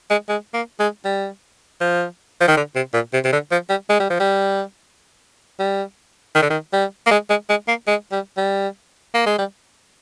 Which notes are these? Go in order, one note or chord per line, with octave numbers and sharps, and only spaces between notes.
G#3
G#3
A#3
G#3
G3
F3
F3
D#3
D3
C3
A#2
C3
C3
D3
F3
G3
G#3
G3
F3
G3
G3
D#3
D3
D#3
G3
A#3
G#3
G#3
G#3
A#3
G#3
G3
G3
A#3
G#3
G3